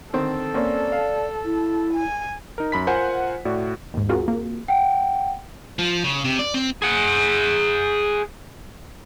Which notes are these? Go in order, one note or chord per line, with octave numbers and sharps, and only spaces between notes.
D3 D#3 C4 A4
A#3 C4 C#4 D5
F5
E4
G#5
D#4 A#4
F#2 B5 B6
F4 A#4 C5 F#5 G#5
A2 F#4 D5
D#2 G#2
C4 F4 F#4 G#4 A#4
A#3
F#5 G5
F3
C#3
C3
D5
C4
G#4 F#5